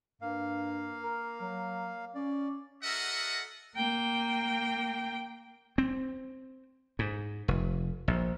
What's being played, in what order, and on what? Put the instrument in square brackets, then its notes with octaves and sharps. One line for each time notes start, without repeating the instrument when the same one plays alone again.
[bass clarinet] G2 [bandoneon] A#3 F5
[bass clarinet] A#4
F#3
[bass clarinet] C#4 [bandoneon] D5
[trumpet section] F#4 A4 A#4 D#5 E5 F#5
[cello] A#3 G5
[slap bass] C4
G#2
F1
A#1